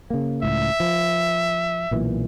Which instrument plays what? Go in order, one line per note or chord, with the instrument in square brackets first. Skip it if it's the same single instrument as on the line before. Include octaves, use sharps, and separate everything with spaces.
[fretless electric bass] C#3 A#3
[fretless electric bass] C#2 A2 [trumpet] E5
[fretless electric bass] F3
B1 A#2 E3